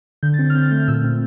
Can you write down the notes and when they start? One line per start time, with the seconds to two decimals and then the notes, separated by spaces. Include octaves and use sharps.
0.23 D3 G6
0.34 A6
0.39 C4
0.45 A6
0.50 F6
0.55 C4 G6
0.63 A6
0.71 A3 G6
0.80 F6
0.88 A#2 E6
1.04 C4